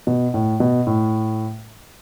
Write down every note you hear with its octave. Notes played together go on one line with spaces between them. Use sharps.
B2
A2
B2
A2